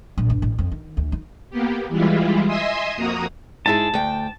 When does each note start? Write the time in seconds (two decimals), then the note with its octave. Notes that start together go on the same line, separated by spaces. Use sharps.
0.18 A#1
0.30 G1
0.42 A1
0.58 F2
0.72 D#3
0.97 D2
1.12 D#4
1.50 A#3 B3 G4
1.89 E3 G3 G#3 E4 F4
2.47 D#5 E5 G#5 C6 D#6 E6
2.96 F2 A#3 F#4 A#5 D#6
3.66 G#2 E4 G#4 A5
3.94 D2 G5